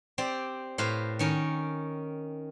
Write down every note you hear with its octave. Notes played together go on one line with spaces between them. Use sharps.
C4 G4 D5
A2 B4 C5 F5
D#3 C#4 A#4